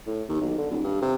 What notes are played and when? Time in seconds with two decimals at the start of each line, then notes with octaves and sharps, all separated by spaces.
0.07 A2
0.29 D#2
0.41 B1
0.58 D3
0.71 D#1
0.84 G2
1.01 C3